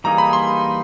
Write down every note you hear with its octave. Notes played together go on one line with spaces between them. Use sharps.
E3 G3 A#3 D#4 G#4 A#5
B5
C6